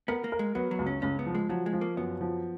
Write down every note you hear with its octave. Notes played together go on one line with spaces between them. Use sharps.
B3 A#4
A#3
A#4
G#3
F#3 B3
F#3
C#2
C#4
C#2 C#4
B3
F3
G#3
F3 F#3
G#3
F3
A#3
F#2 B3
F3